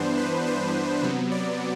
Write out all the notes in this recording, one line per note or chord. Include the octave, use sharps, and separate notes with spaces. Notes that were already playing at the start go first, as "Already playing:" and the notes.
Already playing: G2 E3 B3 D4 C5
B4
C5
C3 F#3 B3
D5